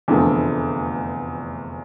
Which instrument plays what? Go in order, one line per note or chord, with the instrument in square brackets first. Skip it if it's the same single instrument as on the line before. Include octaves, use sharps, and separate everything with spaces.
[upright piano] F1 E2 D3 F3 A3